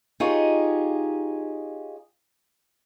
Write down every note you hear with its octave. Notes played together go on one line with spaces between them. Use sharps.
D#4 F4 G4 G#4 C#5 D#5